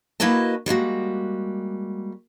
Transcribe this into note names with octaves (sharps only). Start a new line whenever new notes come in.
A#3 E4 F#4 B4 D#5 A5
G3 G#3 A#3 F#4